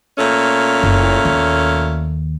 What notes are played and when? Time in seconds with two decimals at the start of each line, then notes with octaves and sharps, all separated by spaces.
0.18 A#2 A3 C#4
0.83 F#1
1.25 D#2